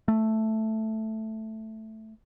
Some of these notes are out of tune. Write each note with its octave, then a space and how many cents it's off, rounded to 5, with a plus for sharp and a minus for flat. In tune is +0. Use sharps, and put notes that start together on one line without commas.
A3 +0